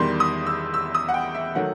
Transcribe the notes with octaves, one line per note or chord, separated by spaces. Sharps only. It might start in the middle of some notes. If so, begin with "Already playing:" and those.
Already playing: E2 D#3 G3 C6
D#6
E6
E6
D#6
F#5
G5
E5
D#3 F#3 A3 F#5